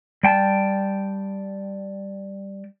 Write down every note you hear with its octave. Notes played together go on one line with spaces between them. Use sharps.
G3 G5 A5